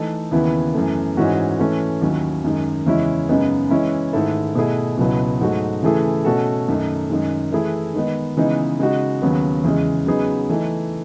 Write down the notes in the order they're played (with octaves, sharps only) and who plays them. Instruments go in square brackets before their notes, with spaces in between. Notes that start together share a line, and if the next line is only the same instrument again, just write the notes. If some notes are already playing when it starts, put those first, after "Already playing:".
Already playing: [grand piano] E3 A3 D#4 A4
D#2 C#3 E3 B3 E4
F#2 E3 A3
G#2 E3 G#3 C#4 F#4
E3 A3 C#4
D#2 D#3 F#3 C#4 E4
F#2 D#3 G#3
E2 C#3 G#3 C#4 E4
F#2 C#3 G#3 B3 D#4
E3 G#3 C#4 E4
G#2 D#3 A3 E4 A4
B2 A3 E4 G#4
C#2 B2 F#3 B3 E4
G#2 F#3 A3 D#4 F#4
C#3 E3 A3 E4 G#4
B2 A3 C#4 F#4 A4
F#2 D#3 A3 D#4
F#2 D#3 G#3
E3 A3 E4 G#4
D#3 G#3 B3 D#4
C#3 E3 G#3 B3 D#4
C#3 G#3 D#4 F#4
D#2 C#3 F#3 B3
E2 C#3 G#3
C#3 F#3 B3 D#4 G#4
E3 A3 D#4